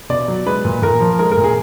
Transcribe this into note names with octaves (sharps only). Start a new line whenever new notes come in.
B2 D5
F#3
G#3 B4
A#2
A#2 A#4
F3
G#3 A#4
A#4
A#2
G#4